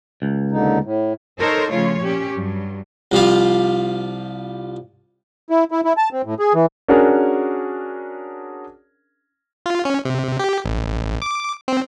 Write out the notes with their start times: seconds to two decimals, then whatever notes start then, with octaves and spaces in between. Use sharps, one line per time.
0.22 C#2
0.52 D#2 D3 D#4
0.84 A2
1.39 D#4 A4 A#4 C5 C#5
1.72 C#3 F3 A3 F4 C#5
2.00 A#2 C#4 G4
2.34 G2 F#3
3.12 C2 F3 G3 F4
5.50 E4
5.71 E4
5.85 E4
5.97 A5
6.13 C4
6.25 A2
6.39 G#4
6.54 E3
6.88 C#4 D4 F#4 G#4 A#4
9.66 F4
9.85 C#4
10.05 C3
10.39 G4
10.65 A1
11.22 D6
11.68 C4